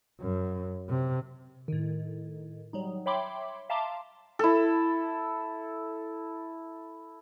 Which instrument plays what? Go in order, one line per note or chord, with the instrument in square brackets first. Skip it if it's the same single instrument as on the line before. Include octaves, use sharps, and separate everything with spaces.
[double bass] F#2
C3
[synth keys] A2 D#3
F#3 G3 D#4
C#5 E5 G5 B5 C6 D6
E5 F5 A5 A#5 C6 D6
[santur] E4 A4